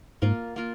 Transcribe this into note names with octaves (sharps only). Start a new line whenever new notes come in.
G#2 A#3 F4 A#4
A#3 F4 A#4